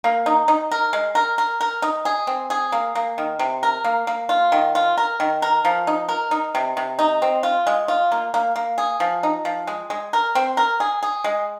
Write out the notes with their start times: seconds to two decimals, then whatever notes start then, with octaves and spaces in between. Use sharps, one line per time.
0.04 A#3
0.26 D#4
0.48 D#4
0.71 A#4
0.93 G#3
1.15 A#4
1.38 A#4
1.61 A#4
1.82 D#4
2.05 G#4
2.27 C4
2.50 G#4
2.72 A#3
2.95 A#3
3.18 D#3
3.39 C3
3.63 A#4
3.84 A#3
4.07 A#3
4.29 F4
4.52 D#3
4.75 F4
4.98 A#4
5.20 D#3
5.42 A#4
5.65 F3
5.87 D#4
6.09 A#4
6.31 D#4
6.55 C3
6.77 C3
6.99 D#4
7.22 C4
7.43 F4
7.67 G#3
7.88 F4
8.12 A#3
8.34 A#3
8.56 A#3
8.78 G#4
9.00 F3
9.23 D#4
9.45 F3
9.67 G#3
9.90 G#3
10.13 A#4
10.35 C4
10.57 A#4
10.80 G#4
11.03 G#4
11.24 G#3